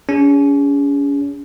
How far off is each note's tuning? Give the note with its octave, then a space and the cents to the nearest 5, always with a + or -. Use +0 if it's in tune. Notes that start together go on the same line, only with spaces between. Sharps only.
C#4 +35 G#4 -25